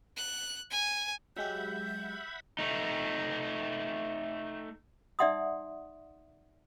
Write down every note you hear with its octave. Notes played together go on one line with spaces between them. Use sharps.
F#6
G#5
F#3 G#3 G4 E5 F#5 B5 G6
A3 D#4
D#4 D5 E5 F#5 C6 D#6